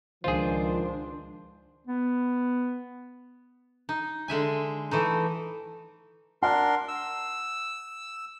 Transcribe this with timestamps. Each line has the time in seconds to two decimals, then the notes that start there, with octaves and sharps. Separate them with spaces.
0.24 C#2 D#3 F3 D4 F4 G#4 C5
1.87 B3
3.89 D#4
4.28 D3 G#3 E5 G#5
4.91 E3 A3 D#4
6.43 D4 A#4 F#5 C6
6.88 E6